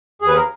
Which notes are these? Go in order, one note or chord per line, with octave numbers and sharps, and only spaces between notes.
D#2 G#4
B4
A#4